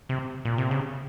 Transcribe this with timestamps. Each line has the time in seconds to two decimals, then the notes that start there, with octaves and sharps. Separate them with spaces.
0.09 C3
0.45 A#2
0.58 C3
0.71 C#3